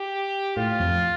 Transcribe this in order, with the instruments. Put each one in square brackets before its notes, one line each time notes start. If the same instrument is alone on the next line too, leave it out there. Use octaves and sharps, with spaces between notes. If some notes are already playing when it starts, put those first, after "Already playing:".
Already playing: [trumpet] G4
[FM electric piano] A2 [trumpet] F4
[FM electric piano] F2